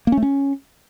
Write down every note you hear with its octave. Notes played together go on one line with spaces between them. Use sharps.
A#3
C#4
A3
C#4